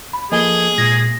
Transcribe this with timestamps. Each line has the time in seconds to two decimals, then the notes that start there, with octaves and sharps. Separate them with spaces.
0.13 B5
0.32 F3 A#3 G#4 A4 D#5 G#5 G7
0.78 A#2 G#3 A#6